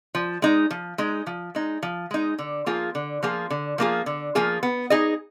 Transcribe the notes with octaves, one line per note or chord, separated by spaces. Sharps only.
F3
G#3 D#4
F3
G#3 D#4
F3
G#3 D#4
F3
G#3 D#4
D3
F3 A#3 F4 G#4
D3
F3 A#3 F4 G#4
D3
F3 A#3 F4 G#4
D3
F3 A#3 F4 G#4
B3
D#4 G#4 D#5